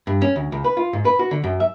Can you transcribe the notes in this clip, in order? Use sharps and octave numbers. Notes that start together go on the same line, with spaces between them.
G2
C#4
D2
C#2
B4
F4
G#2
B4
F#4
D3
F#2
E5